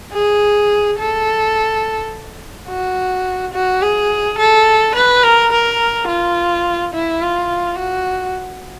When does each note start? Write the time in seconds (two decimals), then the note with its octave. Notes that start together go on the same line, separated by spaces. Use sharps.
0.14 G#4
0.99 A4
2.68 F#4
3.54 F#4
3.82 G#4
4.38 A4
4.95 B4
5.23 A#4
5.52 A#4
6.08 F4
6.94 E4
7.22 F4
7.78 F#4